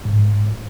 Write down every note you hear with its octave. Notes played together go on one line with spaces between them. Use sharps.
G#2